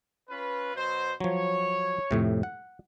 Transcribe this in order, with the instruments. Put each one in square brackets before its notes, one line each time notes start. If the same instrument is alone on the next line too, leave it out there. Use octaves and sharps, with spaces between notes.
[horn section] C#4 F4 B4
B2 F#3 C5
[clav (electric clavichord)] F3 F#3 [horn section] C#5
[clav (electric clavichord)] F2 A2 C3
F#5